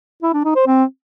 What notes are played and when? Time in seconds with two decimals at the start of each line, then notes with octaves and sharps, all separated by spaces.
0.22 E4
0.34 D4
0.45 D#4
0.56 C5
0.67 C4